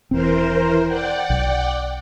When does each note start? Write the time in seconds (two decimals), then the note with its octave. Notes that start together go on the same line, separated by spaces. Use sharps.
0.11 E1 E3 C4 A#4 C5
0.85 D5 F#5 G5
1.30 B1